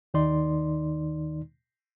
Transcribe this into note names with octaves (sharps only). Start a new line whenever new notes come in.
D#2 D#3 D#4 D5 C6